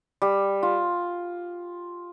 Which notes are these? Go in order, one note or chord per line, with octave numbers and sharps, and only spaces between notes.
G3
F4